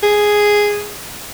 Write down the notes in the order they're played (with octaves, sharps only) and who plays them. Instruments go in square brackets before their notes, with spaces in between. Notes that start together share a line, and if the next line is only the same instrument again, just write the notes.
[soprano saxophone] G#4